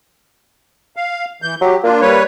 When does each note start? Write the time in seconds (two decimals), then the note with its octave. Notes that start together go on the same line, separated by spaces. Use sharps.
0.96 F5
1.42 E3 G6
1.61 F#3 G4
1.84 A#3 D4 F4
2.01 G3 B4 C#5